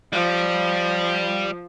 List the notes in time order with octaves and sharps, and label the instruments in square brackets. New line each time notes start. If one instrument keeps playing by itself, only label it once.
[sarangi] F3 [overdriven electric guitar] G3